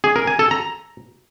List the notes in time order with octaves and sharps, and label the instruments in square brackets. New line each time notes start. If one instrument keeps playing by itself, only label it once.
[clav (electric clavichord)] G#4
A#4
G#5
A4
A#5